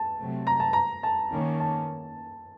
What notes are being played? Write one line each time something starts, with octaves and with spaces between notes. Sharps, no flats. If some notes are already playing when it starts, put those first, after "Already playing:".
Already playing: A5
C3 F#3 A3 C4
A#5
A5
A#5
A5
D#3 A#3 C#4
A5